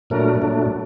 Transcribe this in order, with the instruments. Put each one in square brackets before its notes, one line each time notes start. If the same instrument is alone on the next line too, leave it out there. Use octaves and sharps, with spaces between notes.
[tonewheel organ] A#2 F#3 A3 D4 A#4
A#2 F#3 A3 D4